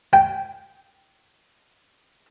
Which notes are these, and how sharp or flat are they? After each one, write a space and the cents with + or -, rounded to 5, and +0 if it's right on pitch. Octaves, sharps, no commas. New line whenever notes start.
G5 -10